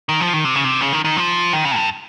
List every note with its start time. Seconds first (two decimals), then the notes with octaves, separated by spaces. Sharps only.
0.09 D#3
0.20 F3
0.33 D#3
0.45 C3
0.55 C#3
0.64 C3
0.81 C#3
0.93 D#3
1.05 D#3
1.17 F3
1.53 D#3
1.65 C#3
1.76 G2